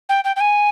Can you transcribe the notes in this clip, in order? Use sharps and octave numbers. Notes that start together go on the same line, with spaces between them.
G5
G5
G5
G#5